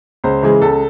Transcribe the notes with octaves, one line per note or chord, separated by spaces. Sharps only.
C#2 C5
C#3 E3 G#3
C#2 A4